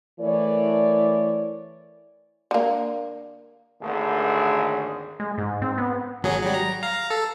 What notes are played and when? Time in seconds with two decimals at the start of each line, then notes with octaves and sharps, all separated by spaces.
0.20 E3 A3 A#4 C#5 D5
2.51 D3 A#3
3.81 G#1 D#2 D3 A3 G#4
5.20 G#3
5.38 G#2
5.62 C4
5.78 B3
6.23 G#1 F#3 G#4
6.42 F#3 G3
6.54 A#5
6.83 F5 A#5
7.10 A4